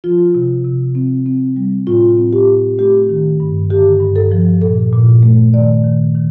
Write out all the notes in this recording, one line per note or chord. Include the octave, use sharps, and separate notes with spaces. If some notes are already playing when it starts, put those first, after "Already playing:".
F3 F4
C3
C3
C4
C4
G3
A2 F4
C4
G4
A2
A3 G4
D#3
G2
D3 G4
G2
A4
F3
A#2 A4
A#2
A3
D#3 D5
D#3
D#3